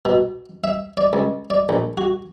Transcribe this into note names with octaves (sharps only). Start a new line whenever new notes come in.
B2
E5
D5
C#2
D5
A#1
F#4